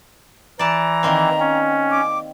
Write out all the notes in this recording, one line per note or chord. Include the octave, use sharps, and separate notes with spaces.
E3 D5 A5 A#5
D#3 A#3 C4
C#4
D6